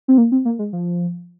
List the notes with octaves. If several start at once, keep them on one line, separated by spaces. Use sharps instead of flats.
C4
A#3
C4
A#3
G#3
F3